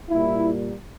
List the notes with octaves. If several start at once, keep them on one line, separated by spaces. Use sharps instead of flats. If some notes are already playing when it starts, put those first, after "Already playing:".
A#2 G3 A#3 E4